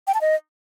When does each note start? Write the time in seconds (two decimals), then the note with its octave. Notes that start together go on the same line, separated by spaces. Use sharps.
0.07 G5
0.14 A5
0.21 D#5